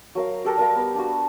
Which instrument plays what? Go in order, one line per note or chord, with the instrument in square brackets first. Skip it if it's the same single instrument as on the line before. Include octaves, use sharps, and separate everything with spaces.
[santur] F#3 A#4 F5
G4 A4 A#4
G3 A#4 F5
B3
D4 F#4